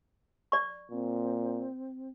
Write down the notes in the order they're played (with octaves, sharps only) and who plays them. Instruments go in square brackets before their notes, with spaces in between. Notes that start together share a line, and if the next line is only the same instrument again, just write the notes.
[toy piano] D5 C#6
[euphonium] A#2 [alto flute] C4